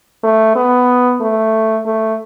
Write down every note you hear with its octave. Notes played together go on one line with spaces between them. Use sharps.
A3
B3
A3
A3